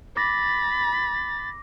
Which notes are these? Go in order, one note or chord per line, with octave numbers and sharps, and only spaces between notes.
B5 D6 A6 A#6